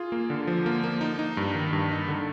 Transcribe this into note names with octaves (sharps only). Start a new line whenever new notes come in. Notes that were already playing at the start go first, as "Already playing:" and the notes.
Already playing: F4 G#4
A#3
D3
F3
A#3
A#3
D#4
D#4
G2
D#3
G2
D#4
D3